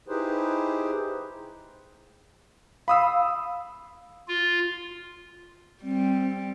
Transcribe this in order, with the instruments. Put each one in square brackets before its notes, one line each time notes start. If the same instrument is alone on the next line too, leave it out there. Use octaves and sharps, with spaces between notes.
[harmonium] D#4 E4 G4 G#4 B4 C5
[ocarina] F5 [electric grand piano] B5 D#6 E6
[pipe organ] F4
[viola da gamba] G3 [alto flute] C4